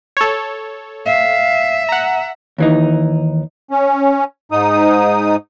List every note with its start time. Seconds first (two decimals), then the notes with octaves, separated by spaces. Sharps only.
0.17 A4 C#5
1.06 E5 F5
1.89 F#5 A#5
2.58 D#2 E3 D#4
3.71 C#4
4.52 G#2 D#4 D#6